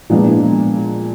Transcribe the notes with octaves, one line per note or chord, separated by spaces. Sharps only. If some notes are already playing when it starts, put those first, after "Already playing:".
A#2 F3 G#3 B3 D4